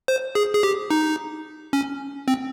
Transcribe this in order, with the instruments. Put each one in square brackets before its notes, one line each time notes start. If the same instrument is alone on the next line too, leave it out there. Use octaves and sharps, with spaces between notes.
[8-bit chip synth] C5
G#4
G#4
G4
D#4
C#4
C4